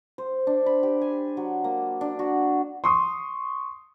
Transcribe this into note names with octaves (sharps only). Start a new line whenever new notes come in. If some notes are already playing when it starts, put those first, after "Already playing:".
C5
D4
B5
G4
G#5
F#3
A#3
D4
F#4
C6 C#6 D#6